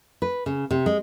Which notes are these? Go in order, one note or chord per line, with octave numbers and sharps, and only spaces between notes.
B4
C#3
C3
G#3